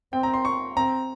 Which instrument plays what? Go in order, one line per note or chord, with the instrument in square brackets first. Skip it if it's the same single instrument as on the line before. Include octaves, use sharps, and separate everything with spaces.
[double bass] C4 [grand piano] G5
[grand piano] A#5
C6
C#6
[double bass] C4 [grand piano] A#5